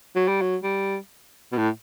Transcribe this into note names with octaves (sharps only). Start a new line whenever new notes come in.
F#3
G3
F#3
G3
B2
A2